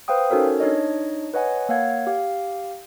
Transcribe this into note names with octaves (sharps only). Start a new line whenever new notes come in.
B4 C5 F5 G5 D#6
C#4 D#4 F#4 A4 A#4 C#5
D4 D#4 C#5 D#5
B4 C#5 D#5 F#5 G#5
A#3 C#5 F5 F#5 G#6
G4 F5